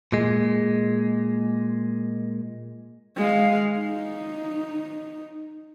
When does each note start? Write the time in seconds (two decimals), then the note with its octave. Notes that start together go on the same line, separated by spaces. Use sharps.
0.12 A#2 G#3
3.17 G#3 F5
3.79 D#4